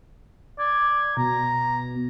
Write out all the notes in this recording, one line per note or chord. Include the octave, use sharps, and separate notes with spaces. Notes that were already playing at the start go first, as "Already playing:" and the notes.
D5 G#6
B2 A#5